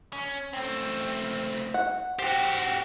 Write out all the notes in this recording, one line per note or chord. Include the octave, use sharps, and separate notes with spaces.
C#4
A3 C4
F#5
F#4 G4 C5 G5